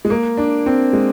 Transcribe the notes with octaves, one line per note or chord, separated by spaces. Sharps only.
G#3
A#3
D4
C4
G#3